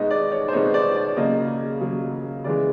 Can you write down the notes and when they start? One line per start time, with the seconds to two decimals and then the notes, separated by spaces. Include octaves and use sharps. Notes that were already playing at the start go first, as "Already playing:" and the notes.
Already playing: B2 G#3 B3 D#4 D#5
0.10 D5
0.31 C#5
0.48 C5
0.53 B2 G#3 B3 D#4 C#5
0.74 D5
0.96 D5
1.17 C#3 F#3 A#3 D#5
1.80 C#3 F#3 A#3
2.44 C#3 E3 G#3 D5